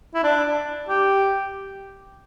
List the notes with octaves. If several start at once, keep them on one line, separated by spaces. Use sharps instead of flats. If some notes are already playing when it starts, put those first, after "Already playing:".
E4
D4
G4